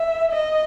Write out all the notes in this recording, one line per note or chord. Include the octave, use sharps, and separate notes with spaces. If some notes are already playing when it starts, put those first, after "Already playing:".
Already playing: E5
D#5